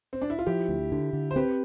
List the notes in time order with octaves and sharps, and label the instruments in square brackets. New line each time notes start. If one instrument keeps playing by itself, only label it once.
[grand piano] C4
D4
E4
F4
[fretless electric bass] F3 [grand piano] E4 G4
[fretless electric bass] D2
D3
D3
[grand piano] C5
[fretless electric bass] C4 [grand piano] G4 B4